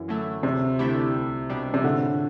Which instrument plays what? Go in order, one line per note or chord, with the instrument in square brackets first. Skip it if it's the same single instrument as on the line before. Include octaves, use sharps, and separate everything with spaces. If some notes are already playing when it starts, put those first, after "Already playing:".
Already playing: [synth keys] F#2 [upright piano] E3
[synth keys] D3 F#3 A3 E4
[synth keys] D2 [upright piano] C3
[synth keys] D3 A3 E4 G4
C2
B2 G3 D4
[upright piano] C3
[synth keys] A2 [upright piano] D3